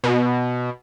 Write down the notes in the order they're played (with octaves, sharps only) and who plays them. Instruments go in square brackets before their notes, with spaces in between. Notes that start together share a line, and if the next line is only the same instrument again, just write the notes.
[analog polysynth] B2